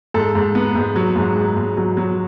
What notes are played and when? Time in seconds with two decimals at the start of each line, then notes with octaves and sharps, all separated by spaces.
0.14 G#2 A4
0.35 G#2
0.55 B3
0.76 G#2
0.96 F#3
1.16 G#2
1.36 G#2
1.57 G#2
1.77 F#3
1.97 F#3